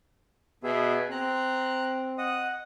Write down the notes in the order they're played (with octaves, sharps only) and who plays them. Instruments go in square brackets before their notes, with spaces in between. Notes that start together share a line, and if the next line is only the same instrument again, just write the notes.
[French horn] B2 [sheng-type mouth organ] B3 G#4 E5
[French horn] C4 [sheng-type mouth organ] A#5 F#6
[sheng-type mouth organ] D#5 F#5 D#6